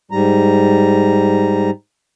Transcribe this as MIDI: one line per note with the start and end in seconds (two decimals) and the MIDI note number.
0.11 1.70 44
0.11 1.70 55
0.11 1.70 82